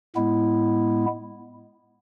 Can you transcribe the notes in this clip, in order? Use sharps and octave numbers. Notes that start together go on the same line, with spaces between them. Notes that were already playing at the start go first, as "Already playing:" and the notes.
A2 G#3 B3 E4